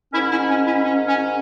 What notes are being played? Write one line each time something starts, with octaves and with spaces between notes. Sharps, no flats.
G#2 D#3 C#4 E4
C#4 E4
C#4
C#4 E4
C#4
C#4